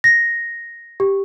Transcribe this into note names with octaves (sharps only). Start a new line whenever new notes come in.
A#6
G4